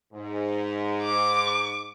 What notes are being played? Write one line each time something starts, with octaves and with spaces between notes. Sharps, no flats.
G#2
D6